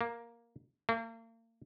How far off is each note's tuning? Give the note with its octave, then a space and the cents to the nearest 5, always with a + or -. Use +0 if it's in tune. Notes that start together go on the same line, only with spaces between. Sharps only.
A#3 +5
A#3 -40